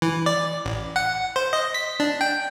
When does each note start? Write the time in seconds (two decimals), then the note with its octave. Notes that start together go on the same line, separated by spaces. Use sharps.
0.02 E3
0.26 D5
0.65 A1
0.96 F#5
1.36 C5
1.53 D#5
1.74 B6
2.00 D4
2.21 G5